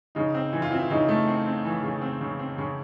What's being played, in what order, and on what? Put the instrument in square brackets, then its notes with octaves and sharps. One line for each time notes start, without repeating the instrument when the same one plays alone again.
[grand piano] C#3 [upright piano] D#4
[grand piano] C4
[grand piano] E3 [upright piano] E4
[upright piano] F4
[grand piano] C4 [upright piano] E4
[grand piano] C#3 [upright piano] D#4
[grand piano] A3
C4
C4
E3
C#3
C4
C#3
C4
C#3